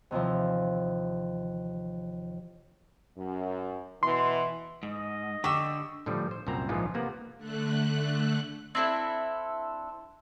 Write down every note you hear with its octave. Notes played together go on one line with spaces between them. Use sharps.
D#2 C3 E3 F3
F#2
B2 E3 C6
G#2 D#5
D3 G4 C#6 E6
A2 D3 F3 G3
C5
C2 F#2 A#2 C4 A#5
A#1 G#2 E3 F3 G#3 F4
C3 A#3 B3 F#5
D3 A3 F#6
C4 D4 E4 A4